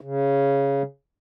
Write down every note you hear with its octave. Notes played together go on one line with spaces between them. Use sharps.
C#3